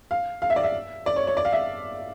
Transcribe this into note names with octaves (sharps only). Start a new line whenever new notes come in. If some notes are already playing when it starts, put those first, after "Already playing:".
F5
F5
E5
D5
E5
D5
C#5
C#5
D5
F5
E5